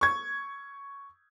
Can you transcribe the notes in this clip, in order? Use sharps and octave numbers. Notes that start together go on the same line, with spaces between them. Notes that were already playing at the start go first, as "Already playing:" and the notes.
C#6 G#6